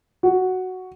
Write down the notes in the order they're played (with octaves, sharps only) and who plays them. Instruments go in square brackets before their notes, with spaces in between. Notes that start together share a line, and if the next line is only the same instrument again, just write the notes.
[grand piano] F#4